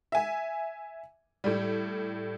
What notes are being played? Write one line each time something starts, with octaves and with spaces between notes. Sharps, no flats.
E5 G#5
A2 G3